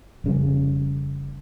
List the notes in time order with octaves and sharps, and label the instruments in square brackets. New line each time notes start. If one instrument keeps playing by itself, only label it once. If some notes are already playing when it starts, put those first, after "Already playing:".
[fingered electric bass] F1 C#3 G3